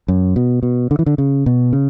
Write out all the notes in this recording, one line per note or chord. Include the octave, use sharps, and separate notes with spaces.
F#2
B2
B2
D3
E3
D3
C#3
B2
C#3